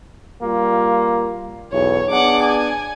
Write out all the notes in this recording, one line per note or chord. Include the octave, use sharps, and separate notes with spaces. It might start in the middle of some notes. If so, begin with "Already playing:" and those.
G3 A#3 F4
B1 E2 C#5
B3 D4 G#4 F#5 D6
G#5